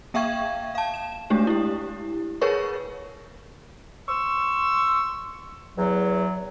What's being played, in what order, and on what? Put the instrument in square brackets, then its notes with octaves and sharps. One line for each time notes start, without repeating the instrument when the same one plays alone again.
[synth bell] A#3 E5 F5 G5 C#6 G#6
F5 A5
E7
G#3 A3 D4 G4
E4 G4
G#4 A#4 B4 C#5 C#6
[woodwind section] C6 C#6 E6
E2 F#3